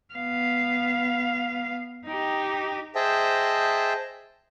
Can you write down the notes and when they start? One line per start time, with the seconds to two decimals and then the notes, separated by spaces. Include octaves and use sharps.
0.14 B3 F5
2.07 D#4 G4
2.95 G#4 C5 D#5 E5 G5 A5